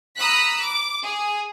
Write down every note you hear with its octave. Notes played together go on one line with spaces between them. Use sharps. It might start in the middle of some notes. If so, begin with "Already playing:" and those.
A#5 B5 D#6 E6 F#6 B6
D6
G#4